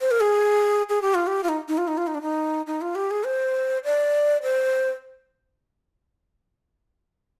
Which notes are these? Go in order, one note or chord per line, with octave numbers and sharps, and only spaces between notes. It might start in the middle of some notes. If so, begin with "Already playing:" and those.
C5
A#4
G#4
G#4
G4
F4
G4
F4
D#4
D#4
F4
D#4
F4
D#4
D4
D#4
D#4
F4
G4
G#4
C5
D5
C5